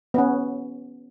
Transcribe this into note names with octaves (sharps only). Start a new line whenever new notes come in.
B3 C#4